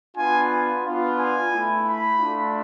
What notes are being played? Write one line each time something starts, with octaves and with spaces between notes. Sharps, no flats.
B3 D4 F4 G#5
B3 D4 F4
G#5
A3 E4
B5
A3 D4 F4